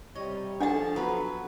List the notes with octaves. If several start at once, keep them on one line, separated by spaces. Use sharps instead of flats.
C3 G3 C#5 D#5
F3 D4 G#4 A4 C#5 F#5 A5
F#3 B3 B4